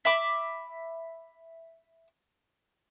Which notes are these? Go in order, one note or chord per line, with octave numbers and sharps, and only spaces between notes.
E5 B5 D6